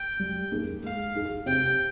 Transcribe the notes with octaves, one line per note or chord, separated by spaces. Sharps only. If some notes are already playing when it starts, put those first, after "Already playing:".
Already playing: G5
G3
A#3 D#4 G#4
G#3 F5
D#4 G#4
C3 G5